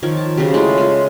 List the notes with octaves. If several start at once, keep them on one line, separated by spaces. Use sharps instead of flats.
D#3 F3 A#4 C#5
A5
C#3 F3 F#3 G4
G#3 A3 E4 A4
G#3 F4